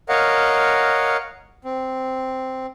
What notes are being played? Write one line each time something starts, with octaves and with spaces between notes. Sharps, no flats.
A#4 C#5 D#5 F5 F#5
C4